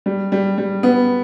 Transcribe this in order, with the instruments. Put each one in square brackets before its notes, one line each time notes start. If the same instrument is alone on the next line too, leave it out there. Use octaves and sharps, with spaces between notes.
[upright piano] G3
G3
G3
B3